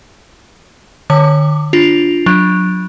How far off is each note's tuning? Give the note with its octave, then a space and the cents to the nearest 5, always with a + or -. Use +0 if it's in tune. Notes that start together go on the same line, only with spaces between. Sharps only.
D3 +40 C#5 +0 D6 +0
D4 +0 F4 +0
F#3 -15 D4 +0